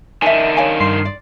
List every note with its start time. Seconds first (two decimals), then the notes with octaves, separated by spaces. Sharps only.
0.22 D#3 D4 E5 G#5
0.57 C#5 F5 G#5
0.80 G2 C6 C7
1.05 D5